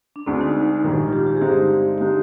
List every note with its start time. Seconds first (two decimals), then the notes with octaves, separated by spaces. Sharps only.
0.16 D4
0.26 D2 D3 G#3 C4 D4 G#4
0.41 D#4
0.84 A#1 G#2 D#3 G3
1.07 F4
1.13 G4
1.26 G4
1.37 G#4
1.41 G2 D3 G#3 C4 D#4 G4
1.98 D3 G#3 D#4 G4